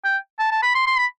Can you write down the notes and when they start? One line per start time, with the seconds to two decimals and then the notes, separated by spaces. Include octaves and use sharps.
0.05 G5
0.39 A5
0.51 A5
0.63 B5
0.75 C6
0.87 C6
0.98 B5